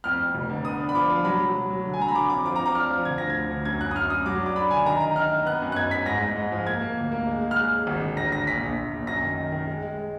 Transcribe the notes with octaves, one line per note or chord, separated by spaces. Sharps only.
F2 F6
F2
F1
D3
B3 D#6
D4
B5
F3 D6
F3
F#3 B5
F#3
F#3
F#3
D3
G#5
F#3 A#5
B5
D3 D6
F2 D6
F3 D6
F3 A#5
D6
D4 F6
F3
D3 G#6
D2 A#6
G#6
D3
D2
F#2 G#6
F#2 F#6
D#6
F#2 F6
F#2 D#6
F#3 D6
D4
D6
D4 B5
D3 G#5
D#3 A#5
D#4 A#5
D#4 F6
D#4
B3 F#6
F#2
F#6
D#4 G#6
D#4 B6
G#2 A#6
G#2
G#2
F3
A#3 G#6
A#3
D2
A#3
G#3
G#3
F6
G#3 F#6
G#3
G#1
D3
G#1 A#6
D3 A#6
A#1 B6
A#1
A#1
A#1
F#2 A#6
D#3
D#3
D#3
G#3
G#3
G#3